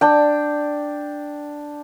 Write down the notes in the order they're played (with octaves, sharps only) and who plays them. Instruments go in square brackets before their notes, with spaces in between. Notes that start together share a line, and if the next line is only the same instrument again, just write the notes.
[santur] D4 G5